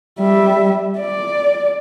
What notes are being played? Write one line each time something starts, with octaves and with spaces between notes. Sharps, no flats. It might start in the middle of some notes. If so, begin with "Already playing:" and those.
G3 E5
D5